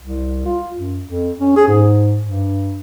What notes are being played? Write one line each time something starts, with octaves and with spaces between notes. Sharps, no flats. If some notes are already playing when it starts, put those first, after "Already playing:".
C2
F4
F#2
F2
C#4
G#4
G#2
G2